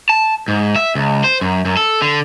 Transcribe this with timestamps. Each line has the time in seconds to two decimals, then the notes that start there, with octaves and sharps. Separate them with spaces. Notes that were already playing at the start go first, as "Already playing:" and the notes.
0.09 A5
0.48 G#2
0.76 E5
0.95 C#2
1.24 C5
1.41 F#2
1.65 F#2
1.77 A4
2.02 D3